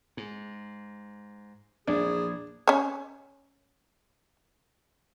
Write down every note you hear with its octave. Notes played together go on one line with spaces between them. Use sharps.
G#2
A#1 E2 D4 G#4
C#4 C#5